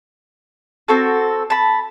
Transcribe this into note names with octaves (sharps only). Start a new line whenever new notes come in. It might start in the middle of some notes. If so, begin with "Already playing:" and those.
C4 F#4 A4
A5 B5